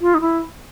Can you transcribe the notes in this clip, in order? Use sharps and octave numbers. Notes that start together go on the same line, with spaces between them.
F4
D#4
E4